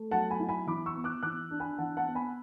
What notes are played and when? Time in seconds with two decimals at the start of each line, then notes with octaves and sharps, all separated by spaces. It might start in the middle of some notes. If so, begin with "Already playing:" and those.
Already playing: A3
0.11 F#3 F#5 A5
0.30 G#5 B5
0.39 E4
0.49 G#5 B5
0.67 E3 B5 D6
0.86 C#6 E6
0.95 B3
1.04 D6 F#6
1.23 E3 D6 F#6
1.51 D4
1.60 G#5 B5
1.78 E3 F#5 A5
1.97 F#5 A5
2.06 B3
2.15 G#5 B5